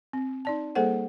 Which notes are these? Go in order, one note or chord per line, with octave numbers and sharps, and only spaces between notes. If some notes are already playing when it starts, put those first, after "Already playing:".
C4
D#4 D5 A5
G3 A#3 G#4 A4 C5 F#5